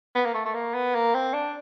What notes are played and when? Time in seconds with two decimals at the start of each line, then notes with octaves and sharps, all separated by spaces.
0.15 B3
0.25 A#3
0.34 A3
0.45 A3
0.54 A#3
0.74 B3
0.94 A#3
1.14 C4
1.34 D4